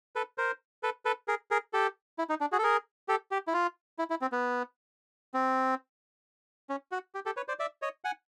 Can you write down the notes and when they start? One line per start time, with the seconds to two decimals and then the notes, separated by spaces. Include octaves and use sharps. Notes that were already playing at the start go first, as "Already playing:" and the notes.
0.16 A4 B4
0.38 A#4 C5
0.83 A4 B4
1.05 A4 B4
1.28 G#4 A#4
1.51 G#4 A#4
1.73 G4 A4
2.18 E4
2.29 D#4
2.41 D4
2.52 F#4 G#4
2.58 A4
2.63 G#4 A#4
3.08 G4 A4
3.31 G4
3.48 E4
3.53 F4
3.99 E4
4.10 E4
4.22 C4
4.32 B3
5.34 C4
6.69 C#4
6.92 F#4
7.15 G4
7.26 G4 A4
7.37 B4 C#5
7.48 C5 D5
7.59 D5 E5
7.82 C#5 D#5
8.04 F#5 G#5